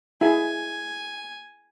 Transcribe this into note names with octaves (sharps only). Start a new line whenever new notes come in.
E4 G#4 G#5